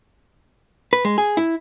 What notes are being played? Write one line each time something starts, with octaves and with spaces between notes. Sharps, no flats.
B4
G#3
G#4
E4